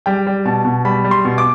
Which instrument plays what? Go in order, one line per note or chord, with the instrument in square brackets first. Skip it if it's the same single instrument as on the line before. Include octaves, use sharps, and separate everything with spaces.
[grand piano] G3 G5
G3
B2 A5
B2
G3 B5
G3
C6
B2
D6